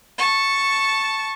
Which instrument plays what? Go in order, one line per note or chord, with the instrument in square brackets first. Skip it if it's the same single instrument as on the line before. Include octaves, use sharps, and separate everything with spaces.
[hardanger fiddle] A5 C#6